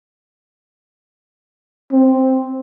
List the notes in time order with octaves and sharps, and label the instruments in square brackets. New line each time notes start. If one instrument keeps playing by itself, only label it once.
[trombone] C4